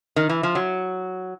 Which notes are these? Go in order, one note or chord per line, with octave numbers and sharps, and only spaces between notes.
D#3
E3
F3
F#3